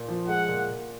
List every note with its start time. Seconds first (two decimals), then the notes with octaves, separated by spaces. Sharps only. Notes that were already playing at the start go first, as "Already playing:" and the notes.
Already playing: A#2
0.08 F3
0.28 G#3 F#5
0.48 A#2
0.69 A#2